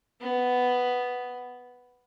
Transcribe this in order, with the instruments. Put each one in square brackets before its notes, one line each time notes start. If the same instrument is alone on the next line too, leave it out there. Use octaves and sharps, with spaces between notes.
[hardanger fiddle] B3